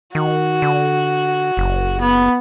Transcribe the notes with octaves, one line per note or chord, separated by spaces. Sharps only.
D#3 F#4
D3
F#1
B3